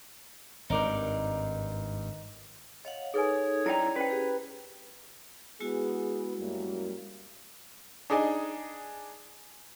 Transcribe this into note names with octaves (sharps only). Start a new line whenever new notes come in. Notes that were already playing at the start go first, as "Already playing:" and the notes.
G#1 G2 D#4 A#4 D5
C#5 D#5 F5 F#5
D#4 G#4 A4 B4 C#5 G#5 D#6
F#2 D#4 E4 D5 G5 A#5
C#4 B4 C5 G5
G4 G#4
G#3 B3 E4 F#4 G#4
F#2 G3 A#3
D4 D#4 G#4 D5 D#5 G#5